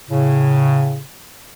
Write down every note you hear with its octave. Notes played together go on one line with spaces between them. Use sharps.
A2 C#3